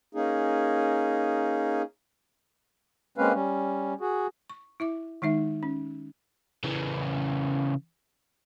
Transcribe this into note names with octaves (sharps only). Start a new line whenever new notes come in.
A#3 C#4 D#4 G#4
G#3 A#3 C4 C#4 B4 F5
G3 C#4
F#4 G#4
C#6
E4 E5 D6
D#3 G#3 D#4 E5
C#4
C#3 E3